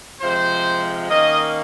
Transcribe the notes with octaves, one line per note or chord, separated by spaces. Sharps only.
C3 F3 G#3 C5
D#3 A#3 C#4 D#5